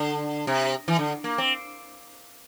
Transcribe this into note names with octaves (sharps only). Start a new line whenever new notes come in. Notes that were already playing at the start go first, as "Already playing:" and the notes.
Already playing: D3
C3
E3
D3
A#3
C4